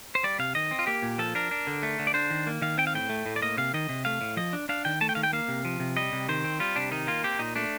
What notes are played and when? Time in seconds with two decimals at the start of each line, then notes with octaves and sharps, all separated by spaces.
0.15 C5
0.23 G3 D5
0.39 C3 F5
0.55 D#3 D#5
0.71 C4
0.79 F4
0.87 A#3 G4
1.03 A#2
1.18 F3 A4
1.35 D4 A#4
1.51 D4
1.67 D3
1.83 A3
1.99 D3
2.07 D5
2.14 D4 C5
2.30 D#3
2.47 A#3
2.62 D#3 F5
2.78 C4 G5
2.87 F5
2.94 A2 G5
3.09 A3
3.26 A2
3.36 D5
3.42 A#3 D#5
3.58 C3 F5
3.74 D#3 D#5
3.89 C3
4.05 A3 F5
4.21 A2
4.37 F3 D#5
4.53 D4
4.69 D4 F5
4.85 D#3 G5
5.01 A3 A5
5.09 G5
5.15 D#3 F5
5.23 G5
5.33 A#3 F5
5.48 C3
5.65 F3
5.80 C3
5.96 G3 D#5
6.13 C3
6.29 D#3 C5
6.44 C4
6.60 G3 F4
6.76 C3 D4
6.91 D#3 D#4
7.07 A#3 F4
7.23 C4 G4
7.39 A#2 D#4
7.56 A3 D4